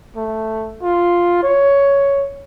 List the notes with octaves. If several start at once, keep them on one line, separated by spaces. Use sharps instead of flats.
A3
F4
C#5